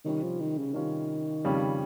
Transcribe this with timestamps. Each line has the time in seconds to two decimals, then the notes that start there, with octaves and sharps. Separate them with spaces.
0.04 C3 D#3 G3 C#4 F4
0.23 F3
0.40 D#3
0.58 C#3
0.74 C3 D#3 G3 C#4 F4
1.45 F2 C#3 G3 C#4